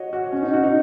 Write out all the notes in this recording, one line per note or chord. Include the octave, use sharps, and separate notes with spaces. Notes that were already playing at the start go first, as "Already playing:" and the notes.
Already playing: F#4 C#5 D#5
F#4
C#4
D#4
F#4
D#4